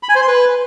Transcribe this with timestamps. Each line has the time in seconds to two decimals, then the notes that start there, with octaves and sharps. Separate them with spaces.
0.03 B5
0.09 G#5
0.15 C5
0.21 C6
0.28 B4